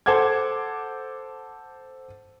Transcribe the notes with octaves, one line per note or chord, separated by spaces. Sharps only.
A4 C5 F#5 D6 G#6